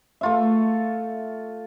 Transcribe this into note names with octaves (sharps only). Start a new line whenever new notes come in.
A3 F4 E5